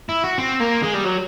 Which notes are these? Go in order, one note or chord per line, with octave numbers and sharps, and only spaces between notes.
E4
F#4
C4
A#3
G#3
G3
F#3